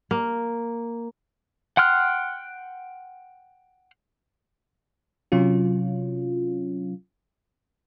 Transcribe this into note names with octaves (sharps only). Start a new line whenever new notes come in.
A#3
F#5 G5 C6 F6 F#6
C3 F#3 C#4 F4